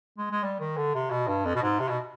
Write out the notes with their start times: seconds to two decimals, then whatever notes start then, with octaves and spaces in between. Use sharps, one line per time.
0.18 G#3
0.31 G#3
0.43 G3
0.60 D#3
0.77 D3
0.95 C3
1.11 B2
1.28 G2
1.45 F2
1.55 B2
1.62 G#2
1.80 C3
1.89 B2